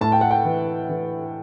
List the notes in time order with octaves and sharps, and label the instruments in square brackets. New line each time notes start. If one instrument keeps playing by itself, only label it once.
[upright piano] A2 A5
G5
F#5
G5
E3
E3